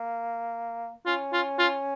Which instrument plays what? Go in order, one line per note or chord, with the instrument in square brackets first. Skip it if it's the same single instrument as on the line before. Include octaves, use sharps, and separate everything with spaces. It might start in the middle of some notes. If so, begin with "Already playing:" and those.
Already playing: [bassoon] A#3
[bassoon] C#4 [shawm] F4
[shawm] F4
F4